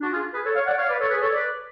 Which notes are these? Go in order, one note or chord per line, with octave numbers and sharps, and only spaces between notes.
D4 F#4
F4 G#4
G#4 B4
A4 C#5
C#5 F5
D5 F#5
C#5 F5
B4 D5
A4 C#5
G#4 B4
A4 C#5
B4 D5